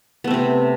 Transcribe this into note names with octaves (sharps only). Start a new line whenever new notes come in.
C3 A3 B3 C4